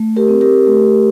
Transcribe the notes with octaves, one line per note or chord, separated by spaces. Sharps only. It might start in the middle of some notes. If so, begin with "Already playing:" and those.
Already playing: A3
G4 A#4
C4
G4 A#4
A3